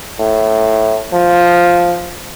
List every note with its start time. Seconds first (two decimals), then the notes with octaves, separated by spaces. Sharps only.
0.20 A2
1.14 F3